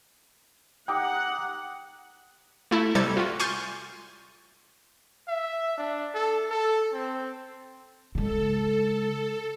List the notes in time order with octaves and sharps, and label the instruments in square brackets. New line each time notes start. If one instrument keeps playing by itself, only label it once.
[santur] D#4 G4 [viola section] F#5 [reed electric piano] G5 D6
[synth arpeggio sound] A3 E4 A4
C3 G3 A4 G#6
F4 F#4
G#5 C6 C#6 F6 G6 A6
[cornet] E5
D4
A4
A4
C4
[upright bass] C#3 G#3 [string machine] A4